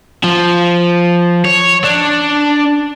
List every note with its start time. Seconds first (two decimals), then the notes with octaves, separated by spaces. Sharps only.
0.24 F3
1.45 C#5
1.84 D4